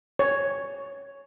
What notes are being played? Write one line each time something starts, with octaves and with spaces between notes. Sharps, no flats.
C#5